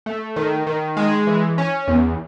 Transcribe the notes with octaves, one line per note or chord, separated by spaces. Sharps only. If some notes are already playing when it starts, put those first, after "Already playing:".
A3
D#3
D#3
G#3
E3
C#4
E2